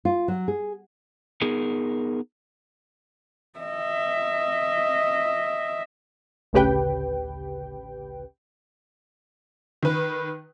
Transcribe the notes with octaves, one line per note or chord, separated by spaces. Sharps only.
F4
F#3
G#4
B3 D#4 G#4 A#4
D#5 E5
A1 D2 C#3 G4 B4 G5
D#3 B4